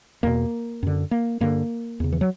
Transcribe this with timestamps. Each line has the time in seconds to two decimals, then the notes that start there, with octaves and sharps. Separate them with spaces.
0.23 E2 B2 A#3
0.83 F#2 D3
1.11 A#3
1.40 G2 D3 A#3
2.00 E2 C#3
2.12 E3
2.21 F#3